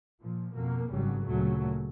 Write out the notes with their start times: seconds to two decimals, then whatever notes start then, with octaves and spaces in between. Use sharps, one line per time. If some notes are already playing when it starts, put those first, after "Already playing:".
0.22 A#2 F3
0.55 F2 B2 A#3
0.91 G#1 G2 C#3 F#3 G3
1.25 D2 A#2 C#3 F#3 A3